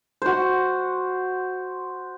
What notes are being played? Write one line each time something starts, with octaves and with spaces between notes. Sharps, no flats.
F#4 C5